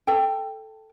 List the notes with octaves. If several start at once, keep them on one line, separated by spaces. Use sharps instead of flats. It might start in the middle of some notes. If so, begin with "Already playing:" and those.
A4 G5